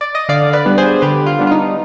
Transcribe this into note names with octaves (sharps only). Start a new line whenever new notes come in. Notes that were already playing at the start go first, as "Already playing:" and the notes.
D5
D#5
D3 D5 F5
B4 D5
G3 B3 D4
G#4 C5
D3 G4 B4
F4
G3 B3 D4
F4
D#4